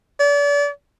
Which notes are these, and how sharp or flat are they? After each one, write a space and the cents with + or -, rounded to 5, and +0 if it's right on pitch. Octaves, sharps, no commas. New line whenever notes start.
D5 -35